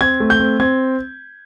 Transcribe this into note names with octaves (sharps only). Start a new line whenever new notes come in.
C4 G#6
A3
G6
C4
C4 G#6